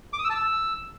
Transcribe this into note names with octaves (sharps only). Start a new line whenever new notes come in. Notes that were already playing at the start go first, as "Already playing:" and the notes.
D6
D#6
E6
A5
E6